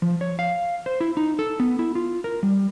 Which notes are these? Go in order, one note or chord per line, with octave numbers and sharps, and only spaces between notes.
F3
C#5
F5
C5
E4
D#4
A4
B3
E4
F4
A#4
G3